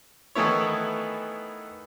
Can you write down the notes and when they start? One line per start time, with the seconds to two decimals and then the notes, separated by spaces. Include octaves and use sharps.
0.35 D#3 E3 A3 B3 E4 C#5